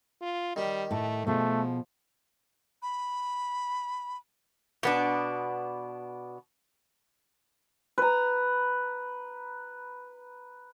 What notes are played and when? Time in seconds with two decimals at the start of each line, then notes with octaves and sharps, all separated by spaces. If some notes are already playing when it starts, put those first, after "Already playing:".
0.22 F4
0.56 D#3 G3 G4
0.91 A2 A3 A4
1.27 B2 F3 A3 G#4
2.82 B5
4.83 B2 B3 D4
7.98 B4 A#5